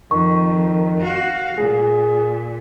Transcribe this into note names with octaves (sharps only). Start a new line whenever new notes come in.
F2 D#3 C#6
F#4 F5
A#2 G#4